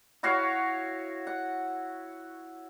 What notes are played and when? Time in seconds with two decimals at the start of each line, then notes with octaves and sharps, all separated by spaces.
0.23 E4 F#4 C#5 F5
1.27 F#5